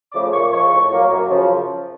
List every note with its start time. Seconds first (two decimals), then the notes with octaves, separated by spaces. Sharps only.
0.12 C#3 F3 A3 D6
0.32 A#2 C#6
0.52 F3 G#3 C#6
0.71 A2
0.90 F#3 A#3
1.10 F#2
1.29 C#3 F3